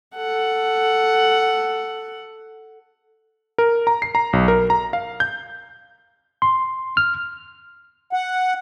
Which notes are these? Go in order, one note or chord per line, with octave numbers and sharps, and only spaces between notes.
A4 F#5
A#4
A#5
C7
A#5
B1
A#4
A#5
F5
G6
C6
F6
F#5